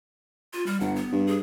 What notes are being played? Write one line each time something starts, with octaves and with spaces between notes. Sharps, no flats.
F4
G3
G1 F#5
B3
G2
G#4